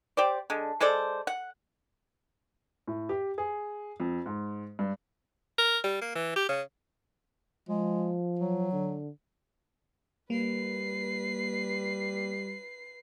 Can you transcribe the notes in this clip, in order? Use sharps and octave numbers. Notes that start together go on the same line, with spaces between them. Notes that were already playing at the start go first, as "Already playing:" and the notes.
G4 C5 D5
D3 G#3
G#3 A4 C5 D5
F#5
A2
G4
G#4
F2
G#2
G2
A#4
G3
A#3
E3
G4
C#3
F3 G#3
F#3
D3
G3 A#3 B4 C7